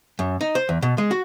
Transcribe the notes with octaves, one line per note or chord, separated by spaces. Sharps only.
F#2
D#4
C5
E2
B2
G#3
F#4